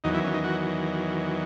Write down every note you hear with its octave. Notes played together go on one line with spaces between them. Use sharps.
E2 D#3 F#3 D#4
E4
C#4
D#4
F#4